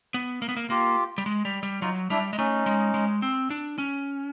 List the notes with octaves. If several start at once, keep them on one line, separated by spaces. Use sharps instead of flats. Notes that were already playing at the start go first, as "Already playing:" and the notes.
B3
A#3
B3
A#3
A#3 F4 G4
G3
G#3
G3
G3
F#3 D#4 F4
G3 D4 E4
G#3
A3 C#4 D#4
G#3
G#3
C4
D4
C#4